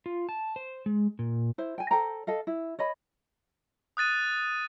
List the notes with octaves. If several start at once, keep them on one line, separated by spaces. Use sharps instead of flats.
F4
A5
C5
G#3
A#2
E4 C5
G5 G#5
A4 C5 G5 A#5
A4 D#5 F5
E4
C#5 D#5 B5
D#6 F#6 A6 D#7